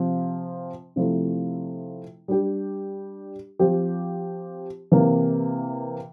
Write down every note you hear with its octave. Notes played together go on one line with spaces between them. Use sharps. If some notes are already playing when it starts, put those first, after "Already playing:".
Already playing: C3 F3 C4
C3 F3 A3 E4
G3 D4 G4
F3 C4 G4
C3 E3 A#3